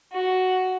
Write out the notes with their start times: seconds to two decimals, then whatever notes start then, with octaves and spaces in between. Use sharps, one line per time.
0.11 F#4